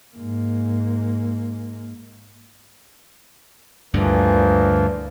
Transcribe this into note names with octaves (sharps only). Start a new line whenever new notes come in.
G#2 A#3
D2 G2 A#2 D3 E3 F3